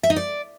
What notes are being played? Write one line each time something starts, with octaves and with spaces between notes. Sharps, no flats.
E5
D#4
D5